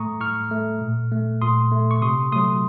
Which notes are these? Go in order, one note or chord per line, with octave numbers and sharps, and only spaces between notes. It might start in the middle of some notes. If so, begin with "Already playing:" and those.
Already playing: A2 A3 A#5 C#6 D#6
A2 C#6 F6
A3
A#2
A3
A#2 C6 D#6
A3
C#6
C3 C6 D#6
F#3 A3 C6 D#6